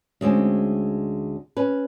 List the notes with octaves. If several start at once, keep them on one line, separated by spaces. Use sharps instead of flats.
D2 G#3 C4 C#4
C#4 B4